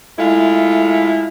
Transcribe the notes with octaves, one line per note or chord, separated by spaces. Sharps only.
G#3 A3 E4 F4